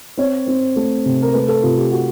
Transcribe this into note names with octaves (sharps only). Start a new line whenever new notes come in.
C4 C#5
C4 C5
A3
C3
A#4
A3 B4
A4
C3 F4
G4
F#4